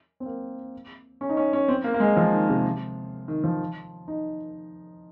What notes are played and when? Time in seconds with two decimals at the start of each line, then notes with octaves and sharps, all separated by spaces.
0.20 C4
0.26 A#3
1.21 C#4
1.29 D#4
1.37 C#4
1.53 C#4
1.68 C4
1.84 A#3
1.94 A#3
2.00 G#3
2.17 F3
2.32 D#3
2.49 C3
3.28 D#3
3.44 F3
4.08 D#4